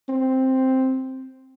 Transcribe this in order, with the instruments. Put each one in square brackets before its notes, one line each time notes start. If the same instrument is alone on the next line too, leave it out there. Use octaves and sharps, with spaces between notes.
[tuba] C4